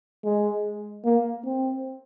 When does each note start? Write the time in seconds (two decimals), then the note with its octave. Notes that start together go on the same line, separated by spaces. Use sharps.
0.25 G#3
1.04 A#3
1.45 C4